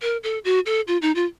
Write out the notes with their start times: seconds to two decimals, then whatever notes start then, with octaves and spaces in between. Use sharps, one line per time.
0.02 A#4
0.24 A4
0.45 F#4
0.66 A4
0.88 F4
1.02 D#4
1.15 F4